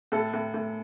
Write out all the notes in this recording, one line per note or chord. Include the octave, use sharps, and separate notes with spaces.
A2 A4
A2
A2